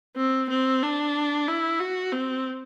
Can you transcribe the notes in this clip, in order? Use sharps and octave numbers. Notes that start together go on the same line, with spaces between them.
C4
C4
D4
E4
F#4
C4